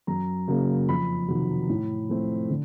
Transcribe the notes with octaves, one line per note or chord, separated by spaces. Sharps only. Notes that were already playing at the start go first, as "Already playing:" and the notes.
F#2 A#5
C#3 F#3 A#3 C#4
F2 B5
C3 D#3 F#3
A2
F3 A3 C4
D3